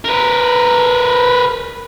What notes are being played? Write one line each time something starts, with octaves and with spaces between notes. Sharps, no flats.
A#4 B4